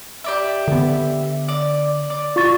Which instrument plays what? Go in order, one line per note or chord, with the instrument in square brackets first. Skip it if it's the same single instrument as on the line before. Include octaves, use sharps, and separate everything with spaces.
[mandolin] G4 D5 E5
[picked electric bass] D3 B3
[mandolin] D5
D5
[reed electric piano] F4 C#6 A6